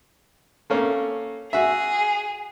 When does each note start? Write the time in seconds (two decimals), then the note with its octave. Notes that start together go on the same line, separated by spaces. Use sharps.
0.70 A3 A#3 C#4
1.53 F#4 G#4 E5